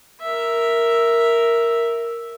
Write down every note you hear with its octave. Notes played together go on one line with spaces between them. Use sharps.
A#4 E5